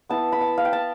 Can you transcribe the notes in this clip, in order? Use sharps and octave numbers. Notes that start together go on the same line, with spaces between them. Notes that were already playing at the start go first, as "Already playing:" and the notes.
B3 E4 A5
B5
A5
F5
G5
A5